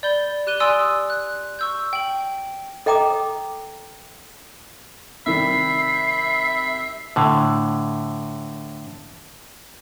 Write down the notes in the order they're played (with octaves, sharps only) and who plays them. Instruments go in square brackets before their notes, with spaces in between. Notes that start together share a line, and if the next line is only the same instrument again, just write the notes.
[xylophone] D5 B5 G6 G7
G4 F#6 D#7 G7
D5 G#5 C6 D#6 E6 D7
F#6
C#6 E6 G6
G5 F#7
[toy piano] A4 D#5 G5 A#5 D6 D#6
[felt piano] C3 D#3 G3 [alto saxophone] E5 [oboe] B5 [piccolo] C7
[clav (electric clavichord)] A2 D3